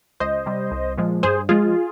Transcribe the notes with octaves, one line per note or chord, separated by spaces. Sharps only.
C#2 C5 D#5
C3 G3
C2
A#2 F3 G#3
G2 G#4 C5
F3 G#3 F4 G#4